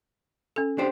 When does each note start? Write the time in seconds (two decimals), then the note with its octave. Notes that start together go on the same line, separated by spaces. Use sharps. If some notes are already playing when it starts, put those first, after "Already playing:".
0.56 C#4 A4
0.78 D4 G4 C5